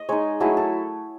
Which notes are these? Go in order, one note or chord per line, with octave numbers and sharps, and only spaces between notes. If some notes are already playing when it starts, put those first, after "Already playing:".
Already playing: D#5
G#3 D#4 C#5
F#3 A3 E4 G#4
A4